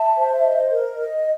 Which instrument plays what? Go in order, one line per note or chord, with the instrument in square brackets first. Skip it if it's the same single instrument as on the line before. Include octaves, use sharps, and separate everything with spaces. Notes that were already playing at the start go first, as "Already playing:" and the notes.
Already playing: [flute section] E5 A5
C5
D#5
A#4
D#5